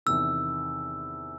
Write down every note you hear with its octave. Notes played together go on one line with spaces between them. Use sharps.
E2 C3 D#3 E6